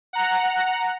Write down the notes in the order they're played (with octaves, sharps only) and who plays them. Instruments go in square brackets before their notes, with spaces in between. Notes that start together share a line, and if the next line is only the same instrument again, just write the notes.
[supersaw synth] F#5 A#5